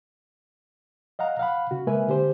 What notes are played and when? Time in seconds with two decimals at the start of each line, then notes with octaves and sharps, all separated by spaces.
1.19 D#5 F5 F#5 A#5
1.39 F5 F#5 B5
1.71 C#3 F#4
1.87 G#3 A#3 A#4 B4 E5 G#5
2.08 D3 G4 C5